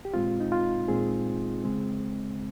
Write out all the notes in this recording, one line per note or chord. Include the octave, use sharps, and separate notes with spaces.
G4
A#2 G#3 C4 F4
D#4
F4
A#2 G#3 C4 G#4
C#3 G#3 C4